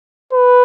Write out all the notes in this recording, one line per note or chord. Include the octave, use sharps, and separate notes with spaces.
B4